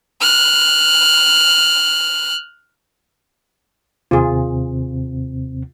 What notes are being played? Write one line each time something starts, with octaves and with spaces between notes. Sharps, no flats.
F6 F#6
D#2 C3 C4 F4 G#4